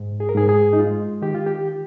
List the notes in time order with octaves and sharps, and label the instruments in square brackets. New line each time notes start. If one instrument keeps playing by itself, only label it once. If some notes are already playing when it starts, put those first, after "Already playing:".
Already playing: [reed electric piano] G#2
G#4
A#4
G#2 G#4
G#4
D#4
G#3 F4
D#3 G4
F4
G4